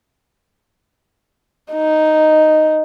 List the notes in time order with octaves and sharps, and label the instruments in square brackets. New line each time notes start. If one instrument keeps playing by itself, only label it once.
[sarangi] D#4